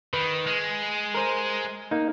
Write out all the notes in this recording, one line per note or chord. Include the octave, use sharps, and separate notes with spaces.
D#3 B4
G#3
A#4 C5
A#3 D#4